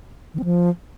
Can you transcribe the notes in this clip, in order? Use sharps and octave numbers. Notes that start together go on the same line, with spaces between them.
D#3
C4
F3